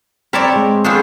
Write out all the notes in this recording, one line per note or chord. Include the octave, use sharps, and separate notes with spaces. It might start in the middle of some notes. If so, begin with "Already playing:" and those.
C4 A#4 C#5 D5 A5 B5
G#3
B3 C#4 D4 F4 G#4 C5